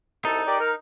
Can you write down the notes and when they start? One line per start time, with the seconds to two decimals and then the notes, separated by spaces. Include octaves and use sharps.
0.25 C2 D#4 A4
0.46 G4 A#4 D5
0.59 A#4